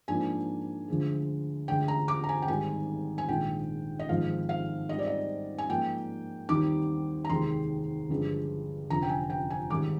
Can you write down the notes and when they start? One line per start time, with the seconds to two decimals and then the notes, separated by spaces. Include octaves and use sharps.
0.08 G#2 F3 A#3 D4 G#5
0.88 D2 D3 F3 G#3
1.68 D2 D3 G#3 D4 G5
1.88 A#5
2.08 D6
2.24 A#5
2.29 G#5
2.42 G5
2.48 G#1 G#2 G3 G#5
3.18 G#5
3.28 A#1 G#2 D#3 G5
3.99 D#5
4.09 G#1 G#2 F3 F5
4.49 F5
4.89 G#2 G3 C4 D#4 D#5
4.99 D5
5.07 D#5
5.58 G#5
5.69 G#2 F3 A#3 G5
6.49 D#2 D#3 G3 C4 D#4 D6
7.25 A#5
7.29 F1 D#2 D#3 G#3 C4 C6
8.09 G1 G2 F3 G#3
8.90 F1 F2 D3 A#5
9.03 G5
9.09 G#5
9.30 G5
9.50 G#5
9.70 G#1 G#2 D#3 G3 D6